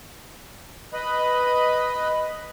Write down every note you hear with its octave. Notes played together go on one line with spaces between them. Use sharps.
B4 D#5 B5